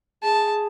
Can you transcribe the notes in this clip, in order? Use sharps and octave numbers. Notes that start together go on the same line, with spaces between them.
G#4 A5